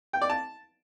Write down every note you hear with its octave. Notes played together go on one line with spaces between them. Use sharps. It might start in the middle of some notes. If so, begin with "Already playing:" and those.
G5
D5
A5